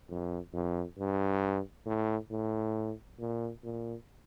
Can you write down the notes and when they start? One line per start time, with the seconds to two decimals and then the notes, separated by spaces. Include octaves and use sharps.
0.09 F2
0.53 F2
0.98 G2
1.86 A2
2.31 A2
3.20 A#2
3.64 A#2